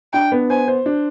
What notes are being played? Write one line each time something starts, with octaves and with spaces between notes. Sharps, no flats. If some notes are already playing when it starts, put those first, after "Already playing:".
D4 G5
B3
C5 G#5
C5
D4